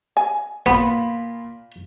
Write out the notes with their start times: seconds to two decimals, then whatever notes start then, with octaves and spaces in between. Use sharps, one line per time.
0.17 G#5
0.66 A#2 B3 F4 B5